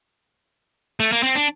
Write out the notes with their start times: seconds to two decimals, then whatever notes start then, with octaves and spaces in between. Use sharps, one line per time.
1.00 A3
1.12 A#3
1.23 C4
1.35 D4